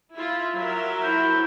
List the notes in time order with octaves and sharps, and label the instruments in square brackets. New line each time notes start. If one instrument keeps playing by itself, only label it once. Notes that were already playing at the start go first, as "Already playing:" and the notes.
[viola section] E4 F4
F#3 A#4 E5
[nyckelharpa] E4 [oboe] C5